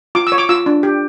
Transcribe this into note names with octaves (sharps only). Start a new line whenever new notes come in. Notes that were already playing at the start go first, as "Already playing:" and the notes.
F4 D6
E6
C#5
D6
F4 E6
D4
G4